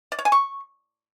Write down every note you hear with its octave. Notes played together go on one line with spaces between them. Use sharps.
D5
C#5
G#5
C#6